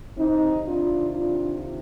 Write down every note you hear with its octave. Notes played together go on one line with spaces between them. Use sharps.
C3 D#3 C4 D#4
D4 F4
D4 F4